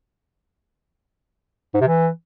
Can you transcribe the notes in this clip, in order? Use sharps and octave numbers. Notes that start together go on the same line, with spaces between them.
G#2
C3
E3